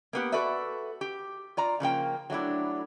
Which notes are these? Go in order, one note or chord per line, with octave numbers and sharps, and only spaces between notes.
A#3 B3 G4
F#4 A4 B4 D5 E5
G4
F4 D5 A#5
C#3 F3 A#3 G5
F#3 A3 D4 E4